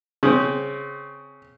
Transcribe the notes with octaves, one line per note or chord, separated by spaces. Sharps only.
C#3 C4